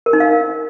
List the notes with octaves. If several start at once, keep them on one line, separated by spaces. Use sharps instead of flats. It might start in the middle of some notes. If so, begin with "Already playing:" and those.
A#4
D#4
F5